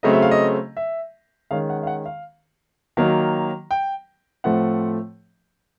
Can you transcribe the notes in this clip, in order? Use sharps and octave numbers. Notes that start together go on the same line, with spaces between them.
C#3 F#3 A3 C4 D#5
E5
F5
D#5
E5
D#3 G#3 C#4 F5
F#5
F5
F#5
F5
D#3 F#3 A#3
G5
A2 F3 A3 C4 F#5